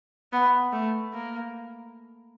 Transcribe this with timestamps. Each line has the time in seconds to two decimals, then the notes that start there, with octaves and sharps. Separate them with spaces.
0.33 B3
0.72 A3
1.13 A#3